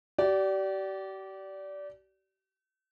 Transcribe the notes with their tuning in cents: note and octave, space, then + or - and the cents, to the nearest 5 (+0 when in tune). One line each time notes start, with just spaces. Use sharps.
G4 -40 D5 -15